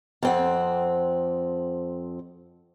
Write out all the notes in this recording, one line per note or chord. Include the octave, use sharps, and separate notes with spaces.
F2 C4 F#5